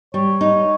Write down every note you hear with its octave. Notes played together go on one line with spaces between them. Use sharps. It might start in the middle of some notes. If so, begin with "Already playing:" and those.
G3 C#5
D#4